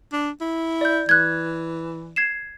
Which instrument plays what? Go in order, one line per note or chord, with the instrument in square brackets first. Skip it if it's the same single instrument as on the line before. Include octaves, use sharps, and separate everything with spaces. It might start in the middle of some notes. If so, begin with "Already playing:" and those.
[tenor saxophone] D4
E4
[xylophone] D5 G6
[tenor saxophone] E3 [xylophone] F#6 G#6
[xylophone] G#6 C7 E7